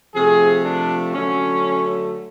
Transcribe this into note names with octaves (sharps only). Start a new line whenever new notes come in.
C3 F3 A3 G#4
D4
D3 F#3 A3 C#4